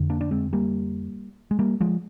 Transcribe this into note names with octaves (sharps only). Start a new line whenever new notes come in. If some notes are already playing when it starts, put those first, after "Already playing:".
Already playing: F2 D3
A#3 D4
D4
G#3 C4
G3 A#3
G#3
G3 A#3
F3 G#3